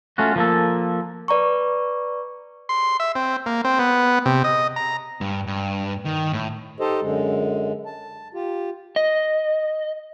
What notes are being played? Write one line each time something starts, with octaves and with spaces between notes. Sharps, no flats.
A3 C#4 F4 F#4
F3 A#3 A4
B4 D5 A#5 C#6
C6
E5
C4
A#3
C4
B3
C3
D#5
A#5
G2
G2
D#3
A2
D#4 G4 A4 C5 D#5
F#2 D3 G#3
A5
F4 G4
D#5